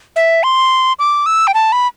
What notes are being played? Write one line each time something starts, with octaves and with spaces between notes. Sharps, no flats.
E5
C6
D6
E6
G5
A5
B5